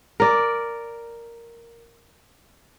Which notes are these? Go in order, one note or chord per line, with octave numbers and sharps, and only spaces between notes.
A#4 D5